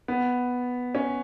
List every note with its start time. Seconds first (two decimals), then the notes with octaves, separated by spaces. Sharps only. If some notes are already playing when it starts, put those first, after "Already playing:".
0.08 B3
0.95 C#4